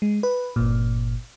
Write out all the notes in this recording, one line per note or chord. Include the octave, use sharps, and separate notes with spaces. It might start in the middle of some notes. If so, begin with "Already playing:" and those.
G#3
B4
G1 A#2